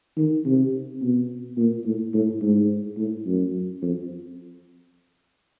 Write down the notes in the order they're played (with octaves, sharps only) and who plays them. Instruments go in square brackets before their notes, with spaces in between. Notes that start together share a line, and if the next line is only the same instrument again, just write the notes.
[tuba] D#3
C3
B2
A#2
A2
A2
G#2
A2
F#2
F2